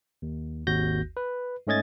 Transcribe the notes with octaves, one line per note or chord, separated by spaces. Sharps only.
D#2
G#1 D#2 F#4 G6 A#6
B4
G#2 A3 C#4 D#5 G#6 A6